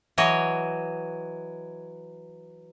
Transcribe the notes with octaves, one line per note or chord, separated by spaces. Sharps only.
E3 F#3 C#5 D#5